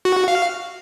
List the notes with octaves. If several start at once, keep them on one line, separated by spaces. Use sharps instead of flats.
F#4
F#4
F5